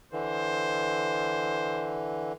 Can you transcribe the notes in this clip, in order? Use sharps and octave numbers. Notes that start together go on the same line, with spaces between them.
D3 E3 C5